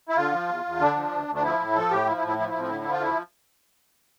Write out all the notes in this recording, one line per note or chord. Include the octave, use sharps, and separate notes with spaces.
E4
D3 F4
F3
E2
E2
D3 D4
F3
D2
D2
D4
F3 E4
A2
F3 A4
A2 G4
F3 E4
E4
A2
E4
F3 E4
A2 E4
C4
D3 E4
E4
F3
F4
D2 E4